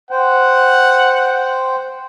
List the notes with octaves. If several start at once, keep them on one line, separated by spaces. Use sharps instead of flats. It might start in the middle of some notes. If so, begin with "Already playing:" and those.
C5 F#5 G5